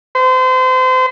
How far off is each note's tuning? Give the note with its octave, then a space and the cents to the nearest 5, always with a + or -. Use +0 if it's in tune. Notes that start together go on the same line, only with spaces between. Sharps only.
C5 -30